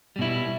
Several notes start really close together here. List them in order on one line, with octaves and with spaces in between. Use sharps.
G3 B2 E4